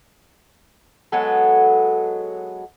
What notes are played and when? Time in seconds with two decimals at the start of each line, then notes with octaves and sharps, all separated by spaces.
1.12 F#3 G#3 B3 A4